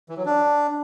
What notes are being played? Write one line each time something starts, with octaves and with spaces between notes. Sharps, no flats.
E3
F#3
D4